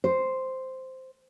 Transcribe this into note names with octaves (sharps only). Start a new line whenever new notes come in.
C5